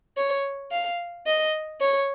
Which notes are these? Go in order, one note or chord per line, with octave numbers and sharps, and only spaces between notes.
C#5
F5
D#5
C#5